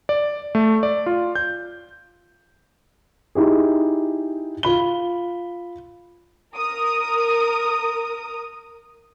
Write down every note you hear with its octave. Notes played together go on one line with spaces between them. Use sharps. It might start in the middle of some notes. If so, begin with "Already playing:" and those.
D5
A3
D5
F4
G6
D#4 E4 G4 G#4
F4 B5 G7
A#4 D#6